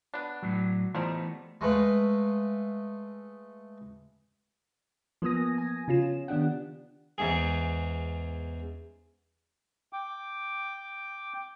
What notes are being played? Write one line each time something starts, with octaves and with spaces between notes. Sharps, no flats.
B3 D4
A2 F#3
E3 F3 G3 A3 B3 D#4
G#3 A3 B4 F5
F3 A#3 B3 G#5 D#6 A#6
G#5
C#3 C#4 F4 E7
D#3 B3 D4 G4 F#5
E2 G#2 G#4
G5 D6